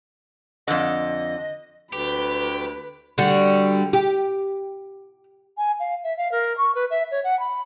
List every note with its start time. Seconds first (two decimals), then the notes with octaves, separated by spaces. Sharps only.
0.68 F2 D3 D#5
1.93 D2 G4 B4
3.18 D3 G3 F#4
3.93 G4
5.58 G#5
5.80 F5
6.04 E5
6.18 F5
6.32 A#4
6.58 C#6
6.75 B4
6.91 E5
7.11 C#5
7.24 F#5
7.40 B5